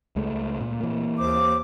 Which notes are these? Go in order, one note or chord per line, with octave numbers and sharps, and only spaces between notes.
C#2 G#3 A3
A#2
E3 A#3
D#2 C5 D6